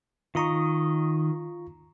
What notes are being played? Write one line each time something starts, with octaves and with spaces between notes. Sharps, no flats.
D#3 F4 D#5 A#5 C#6